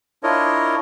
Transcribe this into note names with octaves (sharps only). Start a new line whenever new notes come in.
D4 E4 F4 A#4 C#5 D#5